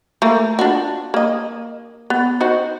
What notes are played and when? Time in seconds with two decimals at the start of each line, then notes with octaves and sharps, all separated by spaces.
0.22 A3 A#3
0.59 D4 F4 F#4
1.14 A#3 D#5
2.10 B3
2.40 D#4 F#4 C5